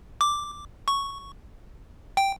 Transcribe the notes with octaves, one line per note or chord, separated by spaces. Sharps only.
D6
C#6
G5